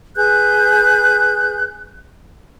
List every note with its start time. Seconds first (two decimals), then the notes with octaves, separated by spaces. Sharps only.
0.16 G#4 B4 F#6 G6